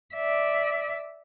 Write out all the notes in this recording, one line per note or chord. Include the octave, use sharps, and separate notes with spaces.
D5 E5